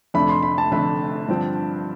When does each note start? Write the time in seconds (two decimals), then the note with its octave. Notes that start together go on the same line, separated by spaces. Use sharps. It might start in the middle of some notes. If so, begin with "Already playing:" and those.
0.14 F1 F2 D3 A3 D4 B5
0.29 C6
0.43 B5
0.58 A5
0.71 F1 F2 D3 A3 D4 B5
1.28 G2 D3 F3 C4